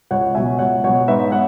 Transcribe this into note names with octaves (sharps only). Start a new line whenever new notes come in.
C#2 C#5 F#5
B2 F#3 E5 G#5
C#2 C#5 F#5
B2 F#3 C#5 F#5
G#2 B4 E5
B3 C#5 F#5